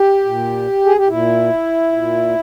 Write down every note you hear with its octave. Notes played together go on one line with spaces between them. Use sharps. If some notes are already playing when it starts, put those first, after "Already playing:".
Already playing: G4
A#2
G#4
G4
A#2 E4
A#2